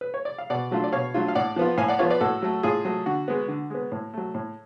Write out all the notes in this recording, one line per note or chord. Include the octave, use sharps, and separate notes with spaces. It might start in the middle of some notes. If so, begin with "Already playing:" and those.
B4
C#5
D5
F5
B2 D5 F#5
F#3 A3 D4 F4
D5
B2 C#5 F5
F#3 A3 D4 F4
F5
A2 D5 F#5
F3 B3 F4
A2 F5 G#5
D5 F#5
F3 B3 F4 C#5 F5
B4 D5
A2 F#4 A4
F#3 A3
A2 F4 G#4
F#3 A3
D3 F#4
G#3 B3
D3
G#3 B3
A2
F#3 A3
A2